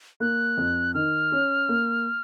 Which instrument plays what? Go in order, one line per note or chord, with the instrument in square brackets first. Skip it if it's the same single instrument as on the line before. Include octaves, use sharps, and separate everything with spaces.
[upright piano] A#3 [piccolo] F#6
[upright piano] F2
[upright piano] D#3 [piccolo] F6
[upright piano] C#4
A#3